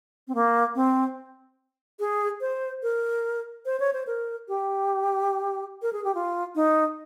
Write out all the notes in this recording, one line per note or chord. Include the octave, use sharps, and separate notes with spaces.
C4
A#3
C4
G#4
C5
A#4
C5
C#5
C5
A#4
G4
A#4
G#4
G4
F4
D#4